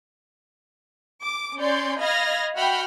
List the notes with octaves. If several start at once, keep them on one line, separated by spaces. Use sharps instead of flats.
D6
C#4 C#5 D5 C6 G6
D#5 F5 B5 F6 G#6 A#6
F#4 E5 F#5 G5 B5 F6